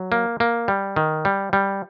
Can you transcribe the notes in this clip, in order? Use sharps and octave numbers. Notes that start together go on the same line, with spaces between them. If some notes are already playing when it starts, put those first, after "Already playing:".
Already playing: F#3
A#3
A#3
G3
D#3
G3
G3